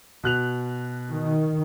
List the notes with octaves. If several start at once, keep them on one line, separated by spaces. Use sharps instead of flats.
B2 F#6 F7
D#3